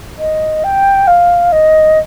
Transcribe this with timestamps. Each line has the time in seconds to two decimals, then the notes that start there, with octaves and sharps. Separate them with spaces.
0.18 D#5
0.64 G5
1.07 F5
1.52 D#5